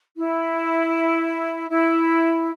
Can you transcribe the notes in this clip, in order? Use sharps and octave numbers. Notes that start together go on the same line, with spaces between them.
E4
E4